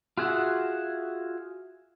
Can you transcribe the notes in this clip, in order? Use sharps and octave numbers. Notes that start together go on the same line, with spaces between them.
F4 F#4 G#4 E5 F#5